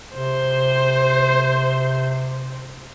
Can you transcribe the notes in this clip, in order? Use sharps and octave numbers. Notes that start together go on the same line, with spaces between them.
C3 C5